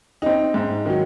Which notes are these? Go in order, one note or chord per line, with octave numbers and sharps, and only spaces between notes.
C4 D#4
G#2
D#3 F#3